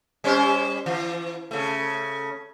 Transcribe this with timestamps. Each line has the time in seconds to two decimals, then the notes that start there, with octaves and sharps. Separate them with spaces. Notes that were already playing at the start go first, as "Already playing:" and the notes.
0.24 G3 C#4 C5
0.86 E3
1.51 C#3 A3